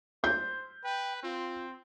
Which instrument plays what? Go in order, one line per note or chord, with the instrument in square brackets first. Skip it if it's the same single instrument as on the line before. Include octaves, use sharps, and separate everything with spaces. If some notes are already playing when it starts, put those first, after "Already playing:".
[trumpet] C5 [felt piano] G6
[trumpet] B4 [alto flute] G5
[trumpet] C4 [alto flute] F4